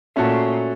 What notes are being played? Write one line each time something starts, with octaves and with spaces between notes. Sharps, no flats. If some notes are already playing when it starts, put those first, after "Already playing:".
A#2 A3 C#4 F#4 A4